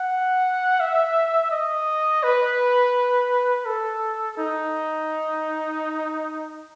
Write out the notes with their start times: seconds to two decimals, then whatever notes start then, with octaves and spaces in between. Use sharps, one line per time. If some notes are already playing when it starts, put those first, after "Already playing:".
Already playing: F#5
0.80 E5
1.52 D#5
2.23 B4
3.66 A4
4.38 D#4